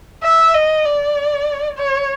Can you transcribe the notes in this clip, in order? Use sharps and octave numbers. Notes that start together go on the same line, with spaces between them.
E5
D#5
D5
C#5